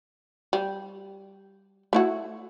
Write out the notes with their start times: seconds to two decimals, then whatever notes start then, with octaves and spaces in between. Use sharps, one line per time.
0.53 G3
1.93 A3 E4 F#4